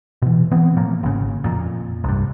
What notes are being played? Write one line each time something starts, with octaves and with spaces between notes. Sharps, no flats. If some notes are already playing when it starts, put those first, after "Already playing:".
B2 E3
E3 B3 C4
A2 F3 A#3
G#1 C#3
F2 A#2
C2 G2